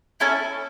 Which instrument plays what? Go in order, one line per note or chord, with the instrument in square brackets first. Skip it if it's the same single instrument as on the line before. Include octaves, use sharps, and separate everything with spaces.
[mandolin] C#4 E4 A4